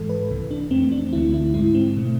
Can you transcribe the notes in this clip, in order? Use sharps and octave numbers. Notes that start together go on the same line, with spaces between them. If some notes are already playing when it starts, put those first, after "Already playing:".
Already playing: G#2 E3 G#3 A4
B4
C2 C3 E3
D4
F2 E3 A3 C4
D4
D2 D3 A3 E4
E4
G#2 G#3 E4
C4
B2 A3